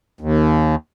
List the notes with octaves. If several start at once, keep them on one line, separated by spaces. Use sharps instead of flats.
D#2